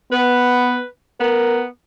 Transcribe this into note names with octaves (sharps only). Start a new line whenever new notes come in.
B3 B4
B3 A#4